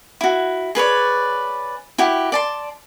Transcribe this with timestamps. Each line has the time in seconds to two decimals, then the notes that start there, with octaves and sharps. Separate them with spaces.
0.21 E4 F#4
0.75 G#4 B4 C#5 D5
1.98 E4 F#4 G4
2.32 D5 A5 C6